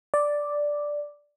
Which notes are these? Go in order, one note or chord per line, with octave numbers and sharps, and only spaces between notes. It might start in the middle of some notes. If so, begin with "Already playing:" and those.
D5